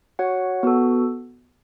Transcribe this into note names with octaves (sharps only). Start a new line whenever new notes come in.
F#4 C#5 F#5
B3 F#4 A4